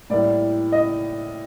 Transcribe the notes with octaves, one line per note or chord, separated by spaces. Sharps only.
A2 G3 A#3 D5
D#5